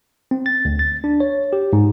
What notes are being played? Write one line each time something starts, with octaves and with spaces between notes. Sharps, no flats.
C4
A6
D2
A6
D4
C#5
G4
G#2